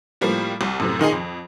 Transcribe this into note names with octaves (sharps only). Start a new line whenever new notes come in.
A2 F3 G3 A#3
C2
F#2 A2 C3
A#2 D#3 D#4 G#4
F2